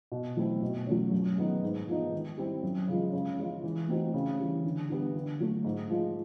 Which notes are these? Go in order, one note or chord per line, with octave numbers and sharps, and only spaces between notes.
B2
F#3 A3 C4 E4
B2
F#3 A3 C#4
F#2
D#3 G#3 B3 D#4
G#2
F3 G#3 B3 D#4
D#3
G3 C4 E4
F#2
C#3 F3 G#3
C#3
F3 G#3 C#4 F4
E3
A3 C4 D#4 F#4
C#3
E3 G3
D3
G3 B3 D4
D3
F#3 A3
G#2
F3 G#3